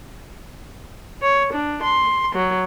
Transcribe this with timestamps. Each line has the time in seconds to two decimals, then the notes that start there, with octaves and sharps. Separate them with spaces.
1.22 C#5
1.52 D4
1.82 C6
2.34 F#3